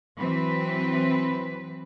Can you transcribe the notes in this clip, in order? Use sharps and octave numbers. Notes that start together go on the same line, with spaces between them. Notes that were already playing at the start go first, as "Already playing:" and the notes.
E3 F#3 C4 B4